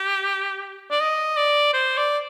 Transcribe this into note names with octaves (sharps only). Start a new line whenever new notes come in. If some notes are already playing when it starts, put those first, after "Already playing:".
Already playing: G4
D5
D#5
D5
C5
D5